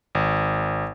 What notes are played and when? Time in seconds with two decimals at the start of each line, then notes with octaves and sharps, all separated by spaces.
0.15 G#1